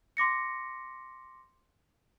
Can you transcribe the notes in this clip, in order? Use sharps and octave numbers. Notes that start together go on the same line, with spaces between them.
C6 D6 A#6 C#7